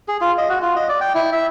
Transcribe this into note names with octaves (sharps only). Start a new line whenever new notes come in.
G#4
F4
D#5
F#4
F4
D#5
D5
G5
E4
E5